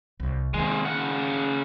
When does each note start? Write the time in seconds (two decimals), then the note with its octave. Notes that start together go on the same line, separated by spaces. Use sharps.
0.20 C2
0.54 C3 D#3 G#3
0.85 C#3 F#5